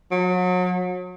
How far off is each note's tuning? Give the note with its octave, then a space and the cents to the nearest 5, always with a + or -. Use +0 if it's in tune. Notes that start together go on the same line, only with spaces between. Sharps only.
F#3 -35